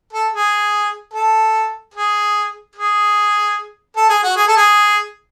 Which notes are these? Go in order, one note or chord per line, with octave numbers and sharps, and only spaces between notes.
A4
G#4
A4
G#4
G#4
A4
G#4
F#4
G#4
A4
G#4